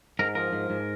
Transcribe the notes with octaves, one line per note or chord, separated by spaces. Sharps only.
G#2 A#4
F3 A#4
G#2
G#2